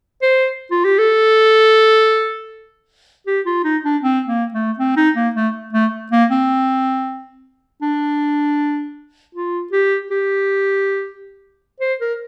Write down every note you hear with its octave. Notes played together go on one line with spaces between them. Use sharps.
C5
F4
G4
A4
G4
F4
D#4
D4
C4
A#3
A3
C4
D#4
A#3
A3
A3
A#3
C4
D4
F4
G4
G4
C5
A#4